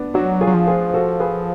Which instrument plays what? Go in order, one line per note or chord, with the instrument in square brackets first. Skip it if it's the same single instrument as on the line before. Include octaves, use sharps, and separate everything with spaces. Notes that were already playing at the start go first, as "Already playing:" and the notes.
Already playing: [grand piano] B3 D4
[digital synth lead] F#3 [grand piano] D4 F#4
[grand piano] F4 G#4
[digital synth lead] F#3
F3
[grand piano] F4 G#4
F#4 A4
G#4 B4